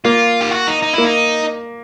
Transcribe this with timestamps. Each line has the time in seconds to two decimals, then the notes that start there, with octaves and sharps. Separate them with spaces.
0.05 A#3 F4
0.41 G4
0.52 F#4
0.67 D#4
0.83 D#4
0.94 A#3 E4
1.04 D#4